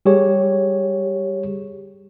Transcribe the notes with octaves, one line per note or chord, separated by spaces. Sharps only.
G3 G4 G#4 C#5